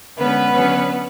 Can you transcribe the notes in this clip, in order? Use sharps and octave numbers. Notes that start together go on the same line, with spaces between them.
D3 G#3 B3 C#4 B4
D3 F#3 C#4